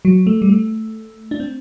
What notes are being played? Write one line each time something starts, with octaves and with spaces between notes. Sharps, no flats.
F#3
A3
G3
A3
D4
C4